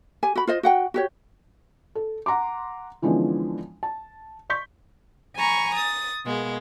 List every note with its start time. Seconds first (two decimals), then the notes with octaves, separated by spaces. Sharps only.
0.23 G4 G#5
0.35 F#4 B5
0.47 F4 C5 D#5
0.63 F#4 F#5 G5
0.94 F#4 G4 C#5
1.95 A4
2.26 F#5 A#5 C6 D6
3.02 D3 E3 F3 G#3 B3 C#4
3.83 A5
4.50 C6 C#6 G6 B6
5.36 G#5 A#5 B5 C#6
5.75 D#6 A6
6.25 B2 G#3 A#3